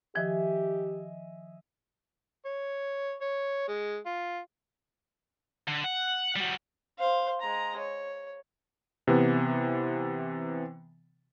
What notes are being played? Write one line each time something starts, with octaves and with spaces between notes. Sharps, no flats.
D#3 F3 G4 D#5 E5 G#5
C#5
C#5
G#3
F4
D3
F#5
G3 F#4
C5 F5
G#3 A#5
C#5
C3 E3 B3